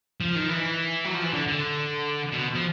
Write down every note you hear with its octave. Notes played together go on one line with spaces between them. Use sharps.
F3
D#3
E3
F#3
F3
E3
D3
D3
B2
F3